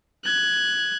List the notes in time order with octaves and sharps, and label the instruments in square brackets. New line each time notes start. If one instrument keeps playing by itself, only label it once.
[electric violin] F#6 G#6